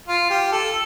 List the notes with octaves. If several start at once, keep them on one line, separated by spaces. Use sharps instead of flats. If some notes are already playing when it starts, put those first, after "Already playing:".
F4
G4
A4